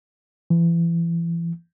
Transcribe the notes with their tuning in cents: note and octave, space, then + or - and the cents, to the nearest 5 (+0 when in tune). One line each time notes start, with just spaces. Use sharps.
E3 +35